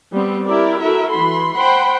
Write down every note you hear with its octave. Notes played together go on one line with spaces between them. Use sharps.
G3 B3 C4
E4 G4 A#4 D5
E4 F#4 A4 A#4 E5
E3 B5 C6
C5 F#5 G5 B5 C6